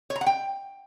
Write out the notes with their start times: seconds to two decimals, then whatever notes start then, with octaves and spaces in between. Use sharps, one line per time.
0.10 C#5
0.16 A#5
0.21 F#5
0.26 G5